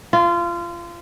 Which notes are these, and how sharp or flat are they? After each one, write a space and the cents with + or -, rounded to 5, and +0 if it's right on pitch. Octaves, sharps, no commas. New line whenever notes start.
F4 -25